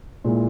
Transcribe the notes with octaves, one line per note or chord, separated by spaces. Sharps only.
A#2 G#3 E4